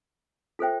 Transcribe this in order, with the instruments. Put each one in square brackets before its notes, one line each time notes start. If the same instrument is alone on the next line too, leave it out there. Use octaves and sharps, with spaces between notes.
[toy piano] F4 A4 C5 E5 G5